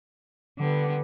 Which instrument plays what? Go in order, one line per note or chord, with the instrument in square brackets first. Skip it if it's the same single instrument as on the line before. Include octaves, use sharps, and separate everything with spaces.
[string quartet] D3 G3 B3